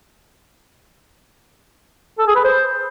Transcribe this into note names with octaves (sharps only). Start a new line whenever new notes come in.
A4
G#4
B4
C5